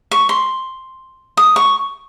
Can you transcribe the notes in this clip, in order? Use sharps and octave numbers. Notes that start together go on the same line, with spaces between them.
C#6
C6
D#6
C#6